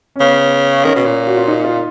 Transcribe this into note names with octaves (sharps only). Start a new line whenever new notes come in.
C#4
C#3 B3
D#3 C#4
B2
A#2
F#4
F4
D#4
F4